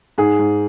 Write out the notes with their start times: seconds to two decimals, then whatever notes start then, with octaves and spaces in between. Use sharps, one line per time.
0.18 G#2 G#4
0.39 G#2